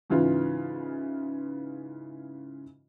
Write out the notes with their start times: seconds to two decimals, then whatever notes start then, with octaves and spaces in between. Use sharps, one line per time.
0.10 G#2 C#3 E3 F4